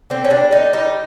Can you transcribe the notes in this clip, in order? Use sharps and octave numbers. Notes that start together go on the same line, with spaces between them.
D3 C4
C#4
G3 D4
D3 D#4
G3 D#4